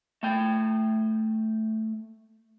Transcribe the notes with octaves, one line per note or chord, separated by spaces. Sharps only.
A3 G5